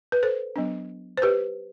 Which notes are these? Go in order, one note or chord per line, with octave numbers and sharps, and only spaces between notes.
B4
A4 C5
F#3 B3 D4
C5
G4 B4